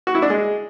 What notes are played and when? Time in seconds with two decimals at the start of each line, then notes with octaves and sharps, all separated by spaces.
0.07 F#4
0.15 E4
0.22 D4
0.30 G#3